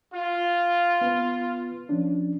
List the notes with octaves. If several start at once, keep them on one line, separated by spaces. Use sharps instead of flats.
F4
B3 B4
F3 C#4 D4